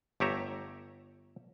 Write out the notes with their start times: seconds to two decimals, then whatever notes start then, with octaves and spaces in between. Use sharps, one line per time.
0.20 G1 A3 G4 C#5 E5 A#5